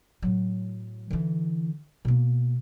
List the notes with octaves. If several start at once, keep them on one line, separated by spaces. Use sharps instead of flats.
A2 F#3
D3 E3
B2 A#3